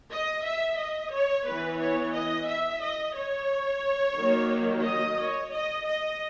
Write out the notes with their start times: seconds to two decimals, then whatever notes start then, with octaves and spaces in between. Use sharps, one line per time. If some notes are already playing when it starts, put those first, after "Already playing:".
0.12 D#5
0.46 E5
0.79 D#5
1.14 C#5
1.48 E3 B3 B4
1.81 C#5
2.15 D#5
2.48 E5
2.82 D#5
3.16 C#5
4.17 D#3 F#3 A#3
4.84 D#5
5.18 C#5
5.52 D#5
5.86 D#5